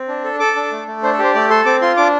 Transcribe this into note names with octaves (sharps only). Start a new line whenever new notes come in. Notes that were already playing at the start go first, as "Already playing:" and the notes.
Already playing: C4
D4
A4
A4 D6
D4
A3
A3
D4 C5
A4
G4 C5
A3 D5
A4 C6
C4 D6
F4 C6
D4 D6